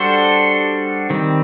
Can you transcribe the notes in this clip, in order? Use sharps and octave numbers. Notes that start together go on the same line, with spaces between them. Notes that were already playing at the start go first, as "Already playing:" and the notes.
Already playing: G3 D4 F#4 A4 C5
D#3 G3 C4